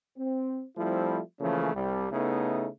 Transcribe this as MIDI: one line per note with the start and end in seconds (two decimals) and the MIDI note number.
0.18 0.65 60
0.78 1.20 53
0.78 1.20 55
0.78 1.20 57
0.78 1.20 60
0.78 1.20 64
1.40 1.73 49
1.40 1.73 52
1.40 1.73 53
1.40 1.73 57
1.40 1.73 58
1.40 1.73 61
1.74 2.06 36
1.74 2.06 55
2.11 2.69 49
2.11 2.69 57
2.11 2.69 59
2.11 2.69 63
2.11 2.69 64
2.11 2.69 69